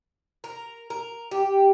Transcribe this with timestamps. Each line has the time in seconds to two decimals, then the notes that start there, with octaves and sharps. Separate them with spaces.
0.44 A#4
0.90 A#4
1.31 G4